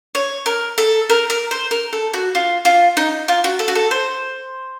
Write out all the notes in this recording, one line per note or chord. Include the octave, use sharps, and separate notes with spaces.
C#5
A#4
A4
A#4
A#4
C5
A#4
A4
F#4
F4
F4
D#4
F4
F#4
A4
F#4
A4
C5